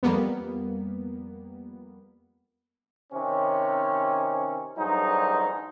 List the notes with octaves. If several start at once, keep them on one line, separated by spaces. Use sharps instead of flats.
F2 G3 A#3 B3
C3 D#3 C4 C#4
A1 G2 F#3 D#4 G#4 C5